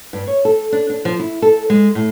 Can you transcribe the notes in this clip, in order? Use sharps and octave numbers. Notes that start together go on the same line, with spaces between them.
G2
C#5
A4
D4
D4
F3
E4
A4
G#3
A2